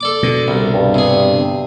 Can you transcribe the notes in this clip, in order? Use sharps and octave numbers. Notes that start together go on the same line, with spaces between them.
A4 D5 D6
B2 D3
C2
G2
C3 G#4